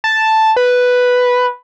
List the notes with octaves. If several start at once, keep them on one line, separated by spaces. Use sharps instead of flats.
A5
B4